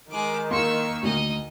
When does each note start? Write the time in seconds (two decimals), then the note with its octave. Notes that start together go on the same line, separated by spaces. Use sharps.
0.11 D#3 G#3 D6
0.51 A#3 C6 C#6 E6
1.03 D2 D#4 D#5